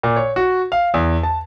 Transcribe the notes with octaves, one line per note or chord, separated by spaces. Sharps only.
A#2
C#5
F#4
F5
E2
A5